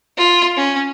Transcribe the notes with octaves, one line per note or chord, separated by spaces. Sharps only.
F4
C#4